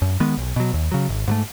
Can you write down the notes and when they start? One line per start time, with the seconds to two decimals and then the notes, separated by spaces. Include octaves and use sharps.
0.02 F#2
0.20 D#3 G#3 B3
0.37 B1
0.56 B2 F#3
0.74 D#2
0.92 C#3 F#3
1.09 G#1
1.28 G#2 F#3 A3